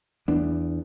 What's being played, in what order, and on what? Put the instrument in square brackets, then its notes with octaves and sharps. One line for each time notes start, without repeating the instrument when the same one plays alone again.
[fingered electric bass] E2 [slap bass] B3 D4